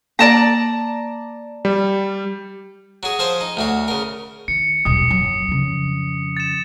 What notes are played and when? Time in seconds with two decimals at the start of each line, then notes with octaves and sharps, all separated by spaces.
0.19 A#3 D5 A5 A#5
1.65 G3
3.03 F#3 G#4
3.19 F3 G#4 C5
3.41 D#4
3.57 D2 F#3 F5
3.88 C#3 A#4
4.48 D#3 C#7
4.85 D#1 B1 D#6 C#7
5.08 F#1 F#3
5.48 F2 C#3
6.37 A6 E7